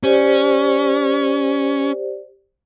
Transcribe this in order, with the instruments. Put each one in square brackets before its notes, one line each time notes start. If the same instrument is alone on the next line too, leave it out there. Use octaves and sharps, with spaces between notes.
[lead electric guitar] C#4 [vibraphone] G4 C5 D5